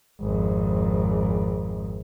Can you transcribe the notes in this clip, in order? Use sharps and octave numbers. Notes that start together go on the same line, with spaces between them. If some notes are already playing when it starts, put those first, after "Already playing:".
G#1 F2